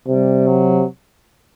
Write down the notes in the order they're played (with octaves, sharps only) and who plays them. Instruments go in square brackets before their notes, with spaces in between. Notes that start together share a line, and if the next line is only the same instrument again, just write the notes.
[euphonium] C3 [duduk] G3
[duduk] F#3